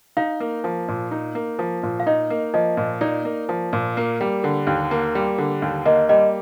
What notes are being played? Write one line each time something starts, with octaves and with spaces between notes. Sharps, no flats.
D#4 F5
A#3
F3
A#2
D#4
A#3
F3
A#2
F5
D#4 D#5
A#3
F3 D#5
A#2
D#4 D5
A#3
F3
A#2
A#3
G3
D3
D#2
A#3
G3
D3
D#2
A#3 D#5
G3 D#5